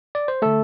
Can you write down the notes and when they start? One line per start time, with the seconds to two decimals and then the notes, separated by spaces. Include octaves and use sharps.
0.15 D5
0.28 C5
0.42 D3 A3 A4